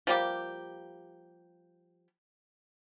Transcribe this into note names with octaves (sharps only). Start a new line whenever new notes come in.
F3 G3 A#3 G4